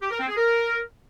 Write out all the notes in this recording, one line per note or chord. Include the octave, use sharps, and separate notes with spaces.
G4
A#4
C4
G#4
A#4